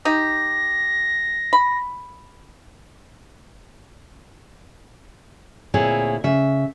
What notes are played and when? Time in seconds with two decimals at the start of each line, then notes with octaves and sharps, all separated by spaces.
0.05 D#4 G4 A#6
1.53 B5
5.74 D2 A#2 C4 E4 G#4 C#5
6.24 C#3 E5